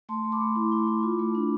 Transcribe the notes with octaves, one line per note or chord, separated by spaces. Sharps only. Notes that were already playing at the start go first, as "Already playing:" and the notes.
A3 A5 C6
A3
B5 D6
A3
E4
E4
E4
F4
A3
D4